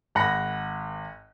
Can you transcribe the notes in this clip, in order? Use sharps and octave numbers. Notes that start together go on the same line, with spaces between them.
G#1 F#5 B5 A#6